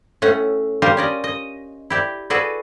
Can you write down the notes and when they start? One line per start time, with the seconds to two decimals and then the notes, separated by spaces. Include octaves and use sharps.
0.22 A2 A3 C#4 F#5
0.82 G3 F4 G4 A#4
0.97 C#4 D5 D#5
1.24 D#5
1.90 E4 G4 D5
2.30 F#4 G#4 A4 B4 D5